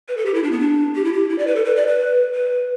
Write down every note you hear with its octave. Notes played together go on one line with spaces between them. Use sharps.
B4
A4
G4
E4
D4
B3
D4
G4
E4
G4
E4
D5
B4
A4
B4
D5
B4
B4